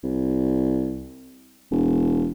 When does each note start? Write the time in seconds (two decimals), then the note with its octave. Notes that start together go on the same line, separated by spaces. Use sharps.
0.03 C2
1.71 E1